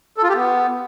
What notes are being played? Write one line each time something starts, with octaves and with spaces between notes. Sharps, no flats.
A4
F4
G4
B3